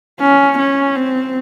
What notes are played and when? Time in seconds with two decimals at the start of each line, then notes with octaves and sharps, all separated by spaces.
0.21 C#4
0.59 C#4
0.96 C4